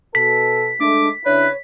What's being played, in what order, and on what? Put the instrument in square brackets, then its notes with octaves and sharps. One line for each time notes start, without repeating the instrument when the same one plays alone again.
[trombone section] B2 A4 [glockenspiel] B6
[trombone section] G#3 A3 [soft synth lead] D4 [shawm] D6
[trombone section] C#3 D4 E4 [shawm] B4 [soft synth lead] C#5